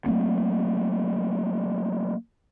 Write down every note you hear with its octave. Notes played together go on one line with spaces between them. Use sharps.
F#3 A3 A#3 C4